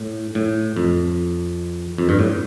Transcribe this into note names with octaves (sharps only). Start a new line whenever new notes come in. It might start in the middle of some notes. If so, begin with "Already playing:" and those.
Already playing: A2
A2
F2
F2
G2
A2